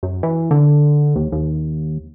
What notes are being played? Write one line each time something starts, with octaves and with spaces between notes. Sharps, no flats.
F#2
E3
D3
D#2
D#2